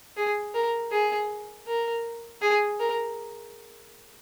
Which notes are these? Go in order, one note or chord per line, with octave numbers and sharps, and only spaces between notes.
G#4
A#4
G#4
A#4
G#4
A#4